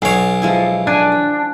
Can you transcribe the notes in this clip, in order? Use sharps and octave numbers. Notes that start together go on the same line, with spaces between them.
B1 F#4 C#5 G#5 C7
F3 G#3 E4
D4 G#5 A5 F#6